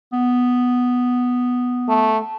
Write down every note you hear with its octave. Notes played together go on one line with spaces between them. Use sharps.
B3
A3